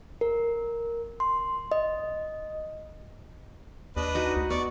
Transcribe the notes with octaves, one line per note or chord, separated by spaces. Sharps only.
A#4
C6
D#5
D#2 D4 B4 D#5
D#4 F#4
D2
B3 D5 C#6